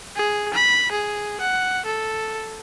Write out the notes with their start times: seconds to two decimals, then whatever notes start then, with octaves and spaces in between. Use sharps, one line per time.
0.16 G#4
0.54 B5
0.92 G#4
1.41 F#5
1.86 A4